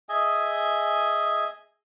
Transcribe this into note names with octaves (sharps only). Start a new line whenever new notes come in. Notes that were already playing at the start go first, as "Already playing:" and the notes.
G#4 D#5 E5 G#5